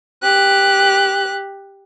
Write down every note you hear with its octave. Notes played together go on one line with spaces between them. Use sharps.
G4 F#6